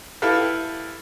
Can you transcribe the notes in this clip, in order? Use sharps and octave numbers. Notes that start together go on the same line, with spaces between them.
E4 G4 A4 B4 F5